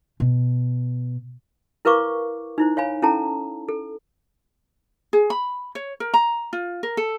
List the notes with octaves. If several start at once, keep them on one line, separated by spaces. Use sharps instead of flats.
B2
E4 A#4 B4 F5 C#6 D6
D#4 E4 C5
C#5 F5 G#5 B5
C#4 E4 A4 A5 A#5
A4
G#4
B5
C#5
A#4
A#5
F4
A#4
A4